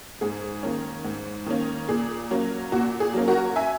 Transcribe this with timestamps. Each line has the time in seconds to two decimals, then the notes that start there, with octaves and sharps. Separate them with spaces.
0.21 G#2 G#4
0.63 D#3 A#3 C#4
1.04 G#2
1.46 D#3 A#3 C#4
1.88 A#2 G#4
2.31 F#3 A#3 C#4
2.72 A#2 F#4
3.00 G#4
3.14 F#3 A#3 C#4
3.28 F#4 A#4
3.56 E5 G#5